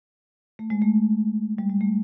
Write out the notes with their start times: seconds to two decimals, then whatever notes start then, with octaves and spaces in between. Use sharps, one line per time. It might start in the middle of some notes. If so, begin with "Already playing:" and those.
0.59 A3
0.70 G#3
0.82 A3
1.58 G3
1.70 G#3
1.81 A3